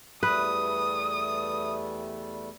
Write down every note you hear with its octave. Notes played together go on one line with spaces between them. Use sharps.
E2 G3 A3 B4 D#6